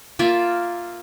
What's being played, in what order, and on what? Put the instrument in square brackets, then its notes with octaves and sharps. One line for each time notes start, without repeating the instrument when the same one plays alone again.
[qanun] A#3 F4 D5 E5